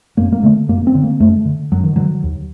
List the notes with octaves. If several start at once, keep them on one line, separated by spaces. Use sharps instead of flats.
F#2 A#3
A#3
D3 A3
F#2 A#3
C4
D3
A#3
F#2 A3
D3
F#2 F#3
D#3
D3 F#3
D#2